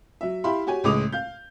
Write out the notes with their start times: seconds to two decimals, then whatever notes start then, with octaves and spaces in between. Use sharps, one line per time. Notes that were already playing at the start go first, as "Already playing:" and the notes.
0.21 F#3 E5
0.44 E4 G4 E5 F5 B5 C6
0.67 F#4 G4 C#5 G#5
0.84 C#2 A2 G#3 D6 D#6 F7
1.12 F5 G6